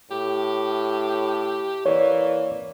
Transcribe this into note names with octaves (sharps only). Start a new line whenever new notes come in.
A2 G4
E3 A#3 C#5 D5